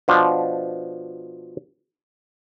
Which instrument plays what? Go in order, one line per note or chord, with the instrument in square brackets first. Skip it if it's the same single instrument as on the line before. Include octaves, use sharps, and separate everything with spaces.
[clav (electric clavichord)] B2 F3 D4